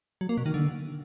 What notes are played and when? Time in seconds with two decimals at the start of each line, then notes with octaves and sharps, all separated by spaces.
0.21 F#3
0.29 A#3
0.37 B2
0.46 D#3
0.54 D3